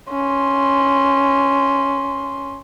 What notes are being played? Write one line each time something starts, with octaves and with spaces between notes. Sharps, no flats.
C#4 C6